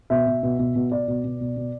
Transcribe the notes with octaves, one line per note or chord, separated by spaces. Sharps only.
B2 E5
B2
B2
B2
B2
B2 D5
B2
B2
B2
B2